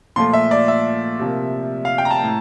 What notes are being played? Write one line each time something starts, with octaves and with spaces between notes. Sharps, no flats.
A#2 F3 A3 C6
E5
D5
E5
C3 F3 A#3
F5
G5
A#5
A5
A2